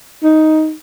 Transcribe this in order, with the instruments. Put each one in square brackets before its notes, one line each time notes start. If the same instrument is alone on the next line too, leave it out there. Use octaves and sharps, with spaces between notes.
[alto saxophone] D#4